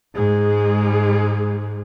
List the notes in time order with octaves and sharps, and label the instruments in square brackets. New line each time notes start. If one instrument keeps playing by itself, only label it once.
[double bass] G#2 [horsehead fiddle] G#3 G#4